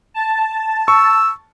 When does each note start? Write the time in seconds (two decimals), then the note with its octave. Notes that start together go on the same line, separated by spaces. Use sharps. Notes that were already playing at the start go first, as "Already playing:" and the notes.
0.14 A5
0.88 C#6 E6